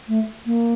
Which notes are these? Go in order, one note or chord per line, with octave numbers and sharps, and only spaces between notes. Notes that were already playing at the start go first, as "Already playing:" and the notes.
A3
A#3